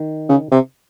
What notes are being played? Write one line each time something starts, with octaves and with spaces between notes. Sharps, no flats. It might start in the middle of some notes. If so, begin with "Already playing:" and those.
Already playing: D#3
C#3
C3